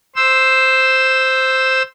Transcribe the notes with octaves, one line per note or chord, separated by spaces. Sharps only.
C5 E6